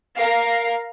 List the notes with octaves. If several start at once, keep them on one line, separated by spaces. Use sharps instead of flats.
A#4 F5